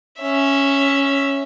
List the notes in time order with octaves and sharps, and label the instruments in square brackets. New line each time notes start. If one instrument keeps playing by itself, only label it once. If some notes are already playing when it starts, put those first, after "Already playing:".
[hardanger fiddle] C#4 E5